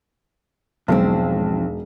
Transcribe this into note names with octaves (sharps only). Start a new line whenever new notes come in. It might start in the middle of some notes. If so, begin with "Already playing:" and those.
E1 B1 F2 G#2 C4